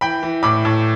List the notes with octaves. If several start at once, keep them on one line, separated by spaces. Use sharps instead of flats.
E3 G5 B5
E3
A2 B5 D6
A2